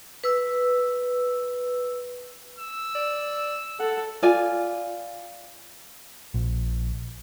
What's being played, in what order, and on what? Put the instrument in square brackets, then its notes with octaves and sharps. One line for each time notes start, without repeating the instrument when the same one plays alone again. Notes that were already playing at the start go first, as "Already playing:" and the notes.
[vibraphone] B4 E6
[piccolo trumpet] E6
[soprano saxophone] D5
[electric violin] A4 [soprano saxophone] F#5
[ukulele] F4 D5 G#5
[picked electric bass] A#1